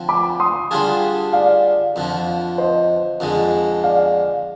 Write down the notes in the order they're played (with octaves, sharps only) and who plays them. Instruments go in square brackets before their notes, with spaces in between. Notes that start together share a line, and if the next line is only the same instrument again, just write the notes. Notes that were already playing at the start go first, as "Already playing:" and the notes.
Already playing: [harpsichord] D3 F3 C4
[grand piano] B5 D6
C6 D#6
[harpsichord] D3 G3 D4 F4 G#4
[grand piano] D5 F5
[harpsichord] F2 D3 F3
[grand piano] C5 D#5
[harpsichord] F2 D3 G#3
[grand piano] D5 F5